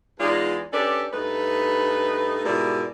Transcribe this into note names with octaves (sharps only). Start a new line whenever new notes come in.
E2 G#3 D#4 F4 D5
C#4 D4 G4 A4 B4 D5
G2 A3 D#4 B4
G#2 B2 G3 E4 A#4 D5